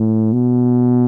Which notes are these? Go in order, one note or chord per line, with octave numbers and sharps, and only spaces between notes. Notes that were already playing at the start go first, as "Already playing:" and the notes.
Already playing: A2
B2